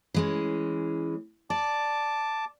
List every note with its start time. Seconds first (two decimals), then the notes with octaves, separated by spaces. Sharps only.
0.14 E3 G#3 C#4
1.50 D5 A5 D6